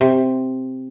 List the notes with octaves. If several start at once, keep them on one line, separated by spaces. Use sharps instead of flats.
C3